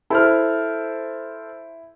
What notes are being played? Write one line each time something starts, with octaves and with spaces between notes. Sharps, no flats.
E4 A4 C5 F6